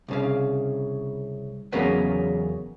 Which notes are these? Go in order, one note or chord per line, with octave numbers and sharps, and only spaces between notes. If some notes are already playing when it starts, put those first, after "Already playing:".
C2 C#3 F5
E2 C#3 F#3 A#3 B3 C#4